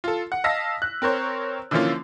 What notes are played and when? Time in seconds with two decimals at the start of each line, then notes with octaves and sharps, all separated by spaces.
0.04 F4 A4
0.32 F#5
0.44 D#5 F5 A5 E6 A#6 B6
0.82 F#6
1.02 C4 A#4 C5 C#5
1.71 D3 E3 F3 A#3 C#4 F4